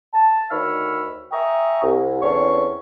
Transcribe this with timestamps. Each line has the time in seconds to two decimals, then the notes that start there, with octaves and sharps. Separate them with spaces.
0.13 A5
0.50 D2 D#3 C#5 B5 E6 F6
1.32 E5 G5 G#5 A#5 C#6 D#6
1.82 C2
2.22 E2 D3 C4 C#4 C#6